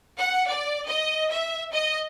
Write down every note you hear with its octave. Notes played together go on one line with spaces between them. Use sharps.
F#5
D5
D#5
E5
D#5